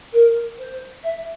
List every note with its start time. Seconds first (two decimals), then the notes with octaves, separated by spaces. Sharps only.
0.13 A#4
0.58 C5
1.03 E5